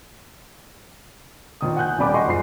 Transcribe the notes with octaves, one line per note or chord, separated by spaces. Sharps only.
A#1 D#3 D#6
F#5 G#5 F#6 G6
D#1 D#3 C#4 D5 B5 D6
D#5 F#5 G#5 C6 C#6
F#1 G#2 F3 C6 C7